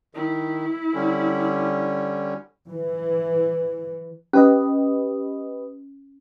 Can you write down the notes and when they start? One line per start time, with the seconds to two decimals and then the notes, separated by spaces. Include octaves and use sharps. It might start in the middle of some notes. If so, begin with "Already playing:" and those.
0.15 D#3 E4
0.94 D3 G3 C#4
2.69 E3
4.33 C#4 G4 B4 D#5